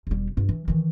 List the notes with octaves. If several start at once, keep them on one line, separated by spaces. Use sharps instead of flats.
E1 G3
G2 F4
E3
D#3 E3